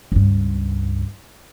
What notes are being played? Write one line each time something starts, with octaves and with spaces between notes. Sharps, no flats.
C#2 G2